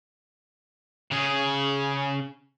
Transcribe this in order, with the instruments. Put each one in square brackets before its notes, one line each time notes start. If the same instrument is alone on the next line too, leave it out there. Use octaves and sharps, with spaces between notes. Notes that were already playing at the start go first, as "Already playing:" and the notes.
[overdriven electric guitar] C#3 G#4